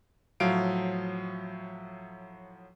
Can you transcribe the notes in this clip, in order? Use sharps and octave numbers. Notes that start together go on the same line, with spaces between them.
A2 F3 F#3 F5 D7